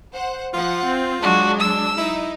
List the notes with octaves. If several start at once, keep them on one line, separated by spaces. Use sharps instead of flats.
C5 F#5
F3 F4 F#5
C4
F#3 G#3 D4 F#4
E6
D#4 E4